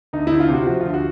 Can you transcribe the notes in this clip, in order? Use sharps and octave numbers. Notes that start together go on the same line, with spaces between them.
D2 D#4
D2 E4
F4
C3 F#4
F3 F#4
D2 F4
F#4